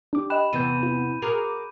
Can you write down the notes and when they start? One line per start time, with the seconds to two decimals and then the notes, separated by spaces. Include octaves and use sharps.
0.13 D4 G4 D6
0.30 D#5 G5 B5 F#6 E7
0.53 E2 C3 E3 B3 G6 D#7
0.83 F4
1.22 F#4 G#4 A#4 D6